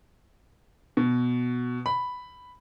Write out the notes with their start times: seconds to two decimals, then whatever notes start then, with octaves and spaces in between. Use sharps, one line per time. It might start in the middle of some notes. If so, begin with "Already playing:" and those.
0.97 B2
1.86 B5